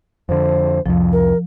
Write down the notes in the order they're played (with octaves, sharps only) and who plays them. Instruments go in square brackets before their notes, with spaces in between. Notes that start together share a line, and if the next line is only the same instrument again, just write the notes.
[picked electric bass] F2 D3 [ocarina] C5
[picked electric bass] C2 F2 [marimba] F3
[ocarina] A#4